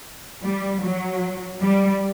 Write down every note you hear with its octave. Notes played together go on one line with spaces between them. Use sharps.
G3
F#3
G3